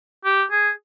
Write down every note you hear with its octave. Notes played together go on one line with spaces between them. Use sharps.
G4
G#4